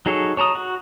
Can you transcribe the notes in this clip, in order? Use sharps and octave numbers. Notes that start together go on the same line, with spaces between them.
F#3 D#4 G#4 A4 C#5
C#5 A5 A#5 D#6
F#4